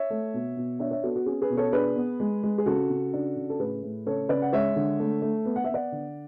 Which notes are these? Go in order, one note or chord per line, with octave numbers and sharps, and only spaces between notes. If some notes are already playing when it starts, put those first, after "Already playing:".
Already playing: C#5 E5
A3
B2
B2
D4 C#5 E5
C#5 E5
B3 F#4 A4
F#4
C#4 G#4
G#4 B4
B2
A4 C#5
D4 G#4 B4
B3
G#3
G#3
G#4
C#3 F#4 A4
C#3
D4
C#3
A4
A2 G#4 B4
A2
C#3 A4 C#5
C#3 B4 D5
F#5
G#3 C#5 E5
D3
A3
A3
B3
F#5
E5
B3
D5 F#5
D3